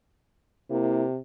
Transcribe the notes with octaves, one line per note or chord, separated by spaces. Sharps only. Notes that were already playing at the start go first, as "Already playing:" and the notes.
C3 A#3 E4